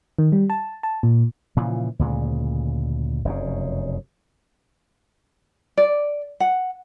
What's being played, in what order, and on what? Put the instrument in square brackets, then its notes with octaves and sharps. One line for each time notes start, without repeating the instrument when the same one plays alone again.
[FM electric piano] D#3
G3
A5
A5
A#2
[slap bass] A#2 C#3 E3 F3
D2 A#2 C#3 G#3
F1 F#2 A#2 C#3
[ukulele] D5
F#5